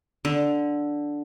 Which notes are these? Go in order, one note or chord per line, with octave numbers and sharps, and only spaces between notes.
D3